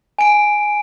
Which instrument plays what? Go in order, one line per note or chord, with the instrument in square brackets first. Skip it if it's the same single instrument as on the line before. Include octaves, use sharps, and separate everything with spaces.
[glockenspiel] G#5 D7